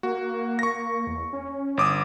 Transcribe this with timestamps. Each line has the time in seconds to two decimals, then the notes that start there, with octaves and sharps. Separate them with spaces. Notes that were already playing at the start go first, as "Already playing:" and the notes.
0.03 A#3 F#4
0.59 C#6 A#6
1.07 E2
1.33 C#4
1.77 G1 D6 D#6